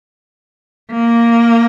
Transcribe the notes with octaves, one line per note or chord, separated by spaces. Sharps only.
A#3